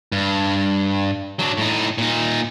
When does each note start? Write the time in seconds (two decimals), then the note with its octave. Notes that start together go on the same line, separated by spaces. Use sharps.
0.12 G2
1.39 F#3 D4
1.58 A2 D#4
1.98 A#2 D#4